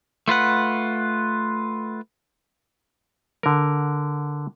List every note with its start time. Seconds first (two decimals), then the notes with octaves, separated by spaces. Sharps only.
0.28 A3 F4 B4 F#5
3.43 D3 A#4